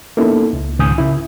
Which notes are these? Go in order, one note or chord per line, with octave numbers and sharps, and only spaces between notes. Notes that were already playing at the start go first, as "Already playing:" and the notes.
A#3 B3 C#4 D#4 E4 A4
C#2
C#2 G#2 D#3 G#5 D#6 G6
C#3 E4